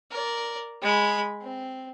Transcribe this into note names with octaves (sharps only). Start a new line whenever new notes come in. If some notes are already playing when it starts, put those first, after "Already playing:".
A#4 D5
G#3 B5
C4